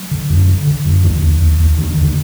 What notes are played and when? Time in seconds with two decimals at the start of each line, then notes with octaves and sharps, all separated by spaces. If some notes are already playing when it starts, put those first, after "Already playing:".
Already playing: F#3
0.11 D3
0.30 F#2
0.48 D3
0.67 D3
0.85 F#2
1.04 D#2 D3 F3
1.22 D#2
1.41 D#2
1.60 D#2
1.78 D3 D#3
1.91 D#3
1.97 D#2
2.03 D3